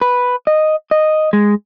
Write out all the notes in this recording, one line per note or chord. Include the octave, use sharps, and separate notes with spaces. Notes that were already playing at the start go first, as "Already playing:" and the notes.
B4
D#5
D#5
G#3